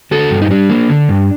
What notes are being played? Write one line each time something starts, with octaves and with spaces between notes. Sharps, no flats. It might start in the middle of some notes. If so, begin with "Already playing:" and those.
D3 F#4 A4
G2
D#4
G3 D4
A#3
D3
G2